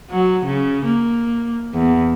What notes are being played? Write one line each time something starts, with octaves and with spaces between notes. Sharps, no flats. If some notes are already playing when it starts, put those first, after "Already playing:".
F#3
C#3
A#3
E2